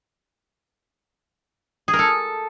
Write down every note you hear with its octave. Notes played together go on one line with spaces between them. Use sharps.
G#4
A#4
A4